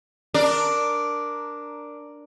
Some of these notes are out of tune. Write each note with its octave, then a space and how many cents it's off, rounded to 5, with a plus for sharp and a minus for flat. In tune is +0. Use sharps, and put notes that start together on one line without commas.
D4 +0 A#4 +0 D5 +0